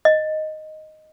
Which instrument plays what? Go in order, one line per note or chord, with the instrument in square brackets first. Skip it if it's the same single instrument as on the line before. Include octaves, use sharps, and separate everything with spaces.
[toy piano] D#5